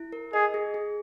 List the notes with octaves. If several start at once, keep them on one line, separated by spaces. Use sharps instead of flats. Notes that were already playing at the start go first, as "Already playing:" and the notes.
Already playing: E4
A#4
G#4 D#5
G#4
G#4